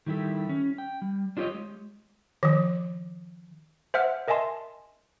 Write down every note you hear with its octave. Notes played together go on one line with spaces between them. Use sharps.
D#3 G3 E4 G4 A4
C#4
G5
G3
D4 F4 G4 A4 C#5 D#5
G#3
D#3 F3
C5 E5 F#5 F6
A#4 D#5 E5 G#5 A5 C6